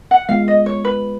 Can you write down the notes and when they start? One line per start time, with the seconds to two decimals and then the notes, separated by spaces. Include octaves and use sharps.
0.11 F#5
0.29 G#3 B3 F4 F5
0.48 D#5
0.66 C#5
0.85 B4